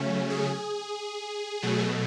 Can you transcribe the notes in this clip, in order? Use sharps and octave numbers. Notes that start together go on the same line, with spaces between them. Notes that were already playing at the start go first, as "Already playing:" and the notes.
Already playing: C#3 F#3 A3 C#4
G#4
B2 F#3 A3